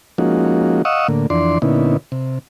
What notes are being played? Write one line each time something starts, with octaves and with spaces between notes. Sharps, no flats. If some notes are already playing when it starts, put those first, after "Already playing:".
F3 G#3 A#3 C#4 D#4 F#4
D#5 F5 F#5 C#6 D#6 E6
A2 D3 A#3
F2 E3 D4 D5 C6
A#2 D3 B3 C#4 D#4 E4
C3